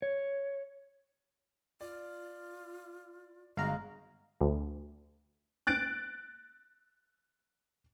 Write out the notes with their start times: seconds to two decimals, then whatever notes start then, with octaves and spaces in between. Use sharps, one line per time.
0.02 C#5
1.81 F4 D5
3.57 G1 G#3 F#4 F5 A#5
4.41 D2
5.67 F#6 A6 D7